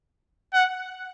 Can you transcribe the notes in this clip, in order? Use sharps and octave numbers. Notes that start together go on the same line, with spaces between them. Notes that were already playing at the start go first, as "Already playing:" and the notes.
F#5